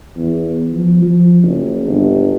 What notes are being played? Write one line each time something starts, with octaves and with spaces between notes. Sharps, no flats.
E2
F3
F3
F#1
G1